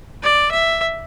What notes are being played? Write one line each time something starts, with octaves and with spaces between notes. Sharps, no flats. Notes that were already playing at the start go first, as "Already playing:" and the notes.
D5
E5